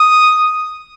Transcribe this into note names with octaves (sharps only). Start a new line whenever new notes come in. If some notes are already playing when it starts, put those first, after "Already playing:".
Already playing: D#6